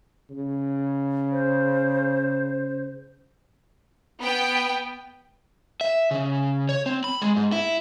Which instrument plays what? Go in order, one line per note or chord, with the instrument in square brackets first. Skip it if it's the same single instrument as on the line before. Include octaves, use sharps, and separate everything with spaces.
[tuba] C#3
[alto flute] C5
[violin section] B3 G5
[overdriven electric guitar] E5
C#3
C#5
C4
B5
G#3
G#2
E4